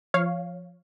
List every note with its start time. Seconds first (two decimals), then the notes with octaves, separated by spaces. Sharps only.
0.14 F3 C#5 F5